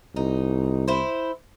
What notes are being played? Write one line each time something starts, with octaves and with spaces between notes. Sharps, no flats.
C2 D#4
E4 C5